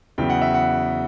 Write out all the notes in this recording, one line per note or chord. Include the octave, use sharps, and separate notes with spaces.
E2 C#3 F#3 B3 E4 G5
F#5
E5
F#5